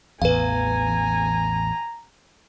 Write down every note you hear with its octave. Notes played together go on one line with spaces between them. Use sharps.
A1 E2 B4 F5 G#5 A#5